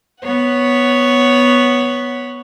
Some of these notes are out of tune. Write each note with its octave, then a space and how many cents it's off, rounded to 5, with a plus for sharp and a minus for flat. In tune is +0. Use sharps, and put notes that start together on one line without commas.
B3 +0 C#5 +0 F#5 +5